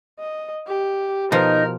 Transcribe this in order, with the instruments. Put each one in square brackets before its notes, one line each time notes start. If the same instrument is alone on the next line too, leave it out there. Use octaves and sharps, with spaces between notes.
[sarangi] D#5
G4
[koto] B2 F3 [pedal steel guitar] D#4 [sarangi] A#4